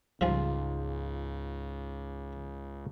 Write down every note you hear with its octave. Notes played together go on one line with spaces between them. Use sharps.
C#2 G#2 F3 G3 F4 G#4